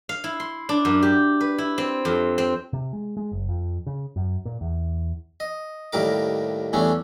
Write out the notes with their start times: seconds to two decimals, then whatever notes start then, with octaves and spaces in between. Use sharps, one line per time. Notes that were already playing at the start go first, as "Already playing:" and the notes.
0.09 F5
0.24 E4
0.40 C6
0.69 D4
0.85 F#2
1.02 G4
1.41 B4
1.58 E4
1.78 C4
2.05 F2
2.38 C4
2.73 C3
2.93 G#3
3.17 G#3
3.32 F#1
3.49 F2
3.86 C#3
4.16 F#2
4.45 A#2
4.61 E2
5.40 D#5
5.93 D#2 A2 G3 A#4 D6
6.73 E2 G3 A3 C#4 D4